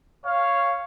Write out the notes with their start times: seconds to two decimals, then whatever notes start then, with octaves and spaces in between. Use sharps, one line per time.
0.24 C#5 F5